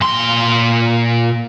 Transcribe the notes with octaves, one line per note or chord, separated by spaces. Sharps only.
A#2 C6